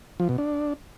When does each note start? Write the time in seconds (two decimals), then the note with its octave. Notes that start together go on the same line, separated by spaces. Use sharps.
0.20 F3
0.29 B2
0.38 D4